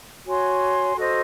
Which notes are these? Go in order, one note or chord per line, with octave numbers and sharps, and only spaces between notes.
F#4 C#5 G#5 C6
F#4 A4 C5 D#5